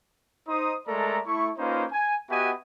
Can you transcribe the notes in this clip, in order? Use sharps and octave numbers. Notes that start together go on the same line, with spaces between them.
D#4 C5 D#6
G#3 A3 A4 A#4 D5 A#5
A3 E4 C#6
A#3 C#4 D#4 F4 B4 C5
G#5
B3 F#4 G4 D#5 E5 G#5